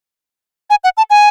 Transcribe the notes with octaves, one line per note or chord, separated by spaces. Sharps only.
G#5
F#5
A5
G#5